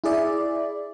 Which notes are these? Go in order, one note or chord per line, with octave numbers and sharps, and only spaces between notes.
E4 G#4 D5 E5